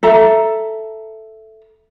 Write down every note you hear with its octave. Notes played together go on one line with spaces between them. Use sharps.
A4 E5 A#5